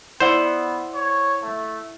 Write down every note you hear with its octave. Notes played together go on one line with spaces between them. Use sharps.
B3 E4 C5 D5 F#5
C#5
A3